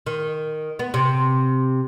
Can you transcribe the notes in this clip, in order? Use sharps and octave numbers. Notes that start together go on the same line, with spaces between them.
D#3
B3
C3